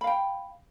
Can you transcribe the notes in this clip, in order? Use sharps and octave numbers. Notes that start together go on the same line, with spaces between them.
F5 G5 B5